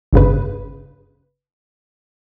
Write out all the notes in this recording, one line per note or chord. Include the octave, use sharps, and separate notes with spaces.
G1 G2 C#3 B4